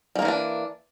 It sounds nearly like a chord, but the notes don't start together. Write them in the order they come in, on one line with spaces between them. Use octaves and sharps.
G3 A#3 D#3 E3 D4